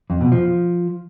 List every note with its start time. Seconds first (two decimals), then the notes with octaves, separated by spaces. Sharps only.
0.10 F2
0.21 B2
0.32 F3